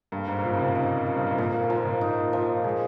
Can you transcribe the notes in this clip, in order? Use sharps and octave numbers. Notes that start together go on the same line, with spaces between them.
G2 A#3
G#2
G#2
A#2 F3
C#3
C3
D#4
F3
G2
G#2
A#2 A#3
G#2
A#2
G#2 F3
A#2
G#2 D#4
F3
A#2 G#3